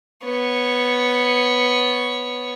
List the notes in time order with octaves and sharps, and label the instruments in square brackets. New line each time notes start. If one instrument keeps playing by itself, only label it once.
[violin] B3 C#5